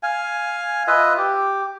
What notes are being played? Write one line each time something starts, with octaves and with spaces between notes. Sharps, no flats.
F5 G#5
F4 B4 D#5 E5
G4